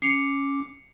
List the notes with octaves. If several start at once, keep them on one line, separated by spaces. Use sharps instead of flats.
C#4 D6 C7 C#7 F7